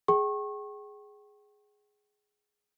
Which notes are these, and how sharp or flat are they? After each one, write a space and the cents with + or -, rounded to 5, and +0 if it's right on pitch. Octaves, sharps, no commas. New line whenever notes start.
G#4 +5 G5 -30 C#6 -30